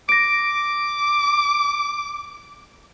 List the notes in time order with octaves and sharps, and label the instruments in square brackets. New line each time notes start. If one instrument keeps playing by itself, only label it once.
[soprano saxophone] D6 [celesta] A#6 D7